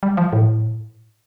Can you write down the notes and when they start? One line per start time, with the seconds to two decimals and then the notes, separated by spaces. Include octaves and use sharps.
0.03 G3
0.17 F3
0.33 A2